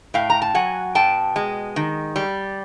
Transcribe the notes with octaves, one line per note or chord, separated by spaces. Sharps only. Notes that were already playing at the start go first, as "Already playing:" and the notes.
A2 F5 G5
A#5
A5
F#3 F#5 G#5
B2 G5 A5
G#3
D#3
G3